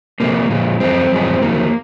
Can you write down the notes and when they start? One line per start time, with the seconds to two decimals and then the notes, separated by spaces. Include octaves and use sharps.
0.20 C3 F3 G#3 A#3
0.50 A#2 F3 G#3
0.80 F#2 F3 G#3 C4
1.12 F#2 F3 G#3
1.41 F2 D#3 F#3 A#3